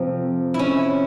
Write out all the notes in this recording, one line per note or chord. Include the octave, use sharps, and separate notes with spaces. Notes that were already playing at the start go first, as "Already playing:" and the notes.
Already playing: F2 C3 F3 C4
E4
C#4